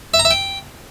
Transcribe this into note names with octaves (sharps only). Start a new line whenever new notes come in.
E5
A#5
E5
G5